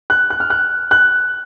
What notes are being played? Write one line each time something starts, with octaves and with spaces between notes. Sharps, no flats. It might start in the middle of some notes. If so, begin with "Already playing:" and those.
F#6
F#6
F6
F#6
F#6